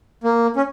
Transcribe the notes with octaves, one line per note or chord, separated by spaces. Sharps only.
A#3
C#4